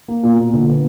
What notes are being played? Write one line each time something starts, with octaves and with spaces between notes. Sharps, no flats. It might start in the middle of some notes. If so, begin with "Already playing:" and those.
A#3
A#2
A#2
D3
B3